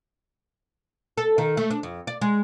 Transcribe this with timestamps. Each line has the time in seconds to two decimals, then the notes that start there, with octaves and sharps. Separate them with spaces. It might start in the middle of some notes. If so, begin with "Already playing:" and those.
1.18 A4
1.38 D#3
1.57 A3
1.71 D4
1.83 F2
2.07 D5
2.21 G#3